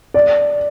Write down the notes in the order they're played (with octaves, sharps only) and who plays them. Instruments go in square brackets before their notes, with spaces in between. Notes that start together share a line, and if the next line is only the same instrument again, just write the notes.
[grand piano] D5